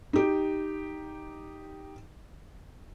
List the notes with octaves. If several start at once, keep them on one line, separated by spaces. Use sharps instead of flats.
D#4 G4